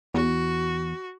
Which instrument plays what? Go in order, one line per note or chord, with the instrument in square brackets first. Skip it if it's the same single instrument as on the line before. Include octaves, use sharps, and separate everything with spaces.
[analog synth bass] E2 [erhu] F#4